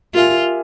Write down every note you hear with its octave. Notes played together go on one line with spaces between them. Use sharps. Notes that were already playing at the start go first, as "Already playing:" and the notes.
F4 G4 A#4 E5 G#5